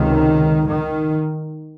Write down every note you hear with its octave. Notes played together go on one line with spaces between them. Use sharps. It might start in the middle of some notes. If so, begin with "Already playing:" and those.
Already playing: C#2 C3 D#3
D#3